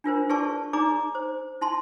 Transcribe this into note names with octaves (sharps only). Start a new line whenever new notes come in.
D4 F4 A#4 C5
E4 G#4 B4 D5 A5 C#6
D#4 G#4 D5 A#5 D6
C5
E4 A5 C6